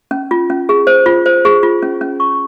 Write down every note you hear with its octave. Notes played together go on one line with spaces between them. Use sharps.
C#4
F4
C#4
G#4
C5
F4
C5
G#4
F4
C#4
C#4
C#6